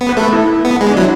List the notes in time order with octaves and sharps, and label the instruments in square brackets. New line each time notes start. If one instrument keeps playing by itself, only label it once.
[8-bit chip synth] B3
[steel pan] B4
[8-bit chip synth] A3 [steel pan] A4
[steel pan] E4
[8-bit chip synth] B3
G#3
[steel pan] D4
[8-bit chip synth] F#3 [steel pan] E4